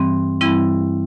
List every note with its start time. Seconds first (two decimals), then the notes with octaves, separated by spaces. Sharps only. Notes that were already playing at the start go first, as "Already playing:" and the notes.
Already playing: G2 E3 G3 C4
0.41 G2 E3 G3 C4 E4